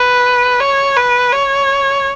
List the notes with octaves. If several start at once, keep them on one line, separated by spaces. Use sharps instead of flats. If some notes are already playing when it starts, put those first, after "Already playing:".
Already playing: B4
C#5
B4
C#5